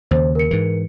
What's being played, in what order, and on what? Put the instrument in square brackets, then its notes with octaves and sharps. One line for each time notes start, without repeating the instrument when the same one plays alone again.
[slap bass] D#2 C#3 [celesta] C5
[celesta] A#4 C#7
[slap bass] G#2 E3